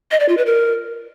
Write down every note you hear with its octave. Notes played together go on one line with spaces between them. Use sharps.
D#5
D5
F4
B4
A#4